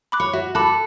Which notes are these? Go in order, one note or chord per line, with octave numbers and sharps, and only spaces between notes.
B5 D6 F#6
C#5
F#4 E5
A4 B5 D6 F#6